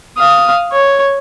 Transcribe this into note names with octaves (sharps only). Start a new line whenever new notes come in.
F5 D#6
C#5